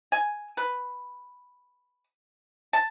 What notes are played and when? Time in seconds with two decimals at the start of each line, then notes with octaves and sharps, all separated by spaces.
0.12 G#5
0.57 B4
2.73 A5